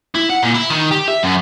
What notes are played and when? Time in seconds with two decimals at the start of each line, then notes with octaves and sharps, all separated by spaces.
0.15 E4
0.30 F#5
0.43 A#2
0.54 E4
0.70 D#3
0.91 G4
1.08 E5
1.23 F#2